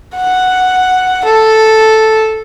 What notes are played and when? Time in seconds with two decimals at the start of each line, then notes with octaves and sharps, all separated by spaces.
0.16 F#5
1.25 A4